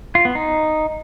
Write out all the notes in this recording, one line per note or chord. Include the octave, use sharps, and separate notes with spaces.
F4
B3
D#4